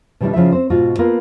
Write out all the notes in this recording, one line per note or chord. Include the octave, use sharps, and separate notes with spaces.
B2 D#3 G3 C#4 D4 E4
C#3 F3 E4 E5
C4 C5
G#2 B2 F4 F#4
A#3 B3 F4 A4 A#4